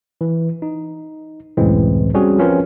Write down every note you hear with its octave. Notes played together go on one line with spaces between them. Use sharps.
E3
D#4
C#2 F#2 A2 E3 G#3 C4
G3 C4 C#4 F#4 G#4
F3 C4 C#4 F4 A#4 B4